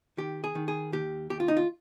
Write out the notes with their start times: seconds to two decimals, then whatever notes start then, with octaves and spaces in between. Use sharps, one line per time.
0.17 D#3 G4
0.44 G#4
0.55 D#3
0.68 G#4
0.92 D#2 G4
1.30 D#2 G4
1.40 F4
1.48 D#4
1.57 F4